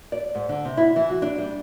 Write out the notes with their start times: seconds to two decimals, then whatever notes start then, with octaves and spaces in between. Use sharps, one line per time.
0.12 D5
0.35 G#2
0.49 D3
0.65 C3
0.77 E4
0.96 E3
1.10 F#4
1.22 D4
1.38 G3